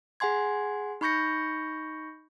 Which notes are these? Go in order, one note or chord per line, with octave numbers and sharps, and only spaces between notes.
G#4 F#5 G#5 C6 G#6
D#4 B5 C#6 G6 A#6 C#7